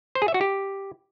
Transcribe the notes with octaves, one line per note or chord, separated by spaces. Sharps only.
C5
G#4
E5
F#4
G4